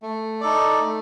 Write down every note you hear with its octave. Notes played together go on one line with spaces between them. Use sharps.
A3
D#4 A4 D5
A3